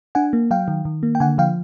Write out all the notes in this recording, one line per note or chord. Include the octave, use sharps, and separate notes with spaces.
D4 F#5 G#5
A#3
F#3 F5 G5
D#3
D#3
A#3
G5
D3 F#5 G#5
F3 F5 G5